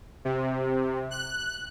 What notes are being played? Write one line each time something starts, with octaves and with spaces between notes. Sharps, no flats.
C3
F#6